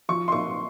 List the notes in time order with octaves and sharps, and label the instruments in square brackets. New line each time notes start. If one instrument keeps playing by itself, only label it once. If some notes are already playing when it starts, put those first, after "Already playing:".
[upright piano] F3 C#6
C6
A#2 C#6